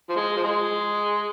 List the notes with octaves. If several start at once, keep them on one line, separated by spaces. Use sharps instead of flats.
F3
G#3
F3
G#3